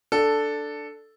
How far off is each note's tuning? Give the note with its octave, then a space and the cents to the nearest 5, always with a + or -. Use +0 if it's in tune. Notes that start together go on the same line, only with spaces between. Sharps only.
D4 +5 A4 +0